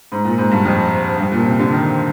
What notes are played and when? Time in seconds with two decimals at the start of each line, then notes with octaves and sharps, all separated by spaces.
0.12 G#2
0.25 A#2
0.38 G#2
0.51 G2
0.65 F2
1.19 G2
1.32 A#2
1.46 C3
1.59 D3
1.72 D#3